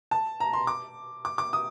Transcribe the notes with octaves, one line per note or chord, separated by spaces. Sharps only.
A5
A#5
C6
D6
D6
D6
D#6